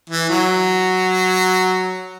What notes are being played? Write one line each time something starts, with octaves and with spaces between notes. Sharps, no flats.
E3
F#3